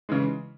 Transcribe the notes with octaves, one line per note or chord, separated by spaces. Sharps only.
C#3 E3 G#3